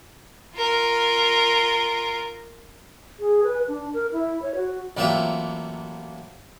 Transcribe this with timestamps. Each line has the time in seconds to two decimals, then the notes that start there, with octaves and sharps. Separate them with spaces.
0.55 F4 A#4
3.19 G#4
3.44 B4
3.68 D4
3.93 A#4
4.12 E4
4.42 C#5
4.56 F#4
4.97 A1 F#3 A#3 C4 F4 E5